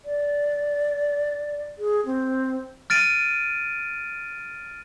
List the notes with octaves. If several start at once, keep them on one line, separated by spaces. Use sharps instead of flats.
D5
G#4
C4
F6 A6 D7 D#7